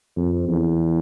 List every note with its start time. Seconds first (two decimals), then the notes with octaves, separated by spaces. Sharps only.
0.17 F2
0.49 E2